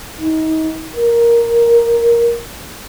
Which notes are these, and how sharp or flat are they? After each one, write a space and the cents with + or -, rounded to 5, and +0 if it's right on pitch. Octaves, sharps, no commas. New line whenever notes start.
D#4 +30
A#4 +5